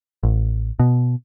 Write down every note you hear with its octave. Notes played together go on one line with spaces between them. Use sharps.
A1
B2